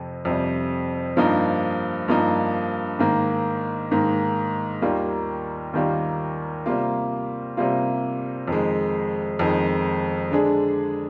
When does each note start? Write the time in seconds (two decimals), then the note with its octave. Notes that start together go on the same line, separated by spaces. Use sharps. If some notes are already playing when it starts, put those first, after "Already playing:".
Already playing: F2 C3
0.25 F2 C3 G3
1.17 G2 F3 A#3 D#4
2.08 G2 F3 A#3 D#4
2.99 G#2 D#3 A#3
3.91 G#2 D#3 A#3
4.82 D#2 D#3 G3 A#3 F4
5.73 D#2 D#3 G3 A#3 F4
6.66 C3 G3 A#3 F4
7.57 C3 G3 A#3 F4
8.48 F2 D#3 G#3
9.39 F2 D#3 G#3
10.31 D3 G#3 D4 G#4